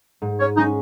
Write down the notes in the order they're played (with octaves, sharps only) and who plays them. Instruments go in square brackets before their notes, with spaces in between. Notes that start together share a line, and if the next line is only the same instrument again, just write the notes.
[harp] G#2
[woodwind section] C#5
[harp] G#3 C#4 [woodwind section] D#4